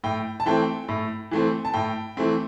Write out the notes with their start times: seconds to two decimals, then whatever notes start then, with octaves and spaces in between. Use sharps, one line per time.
0.04 A2 G5
0.40 A5
0.46 E3 A3 C4 G5
0.88 A2
1.31 E3 A3 C4
1.65 A5
1.74 A2 G5
2.17 E3 A3 C4